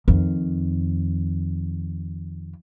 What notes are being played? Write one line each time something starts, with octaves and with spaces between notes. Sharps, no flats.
F2 D#3